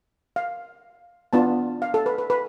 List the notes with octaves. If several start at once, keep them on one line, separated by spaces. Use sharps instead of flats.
F5
B3 D4 F4 A5
F5
A4
B4
B4
B4